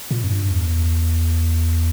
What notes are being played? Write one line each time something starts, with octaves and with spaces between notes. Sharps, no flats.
A#2
F#2
G2
E2